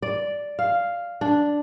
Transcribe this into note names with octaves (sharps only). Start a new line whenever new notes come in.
D5
F5
D4